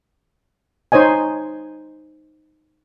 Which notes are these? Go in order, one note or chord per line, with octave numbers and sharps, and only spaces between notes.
D#4 C5 C#5 D#5 G#5